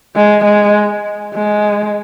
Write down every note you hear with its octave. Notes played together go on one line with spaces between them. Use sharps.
G#3
G#3
G#3